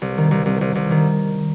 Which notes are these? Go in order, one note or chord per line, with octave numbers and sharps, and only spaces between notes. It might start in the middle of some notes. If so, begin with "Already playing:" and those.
C2
D#3
C2
C2
C2
C2
D#3